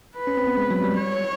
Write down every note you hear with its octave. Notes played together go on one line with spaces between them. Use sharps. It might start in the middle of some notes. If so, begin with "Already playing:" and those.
B4
C#4
C4
B3
G#3
F#3
G3
C#5